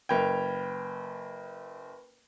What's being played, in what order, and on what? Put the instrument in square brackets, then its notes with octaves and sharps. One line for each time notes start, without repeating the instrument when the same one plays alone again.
[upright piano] F#1 G5 [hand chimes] B4 B5 G#6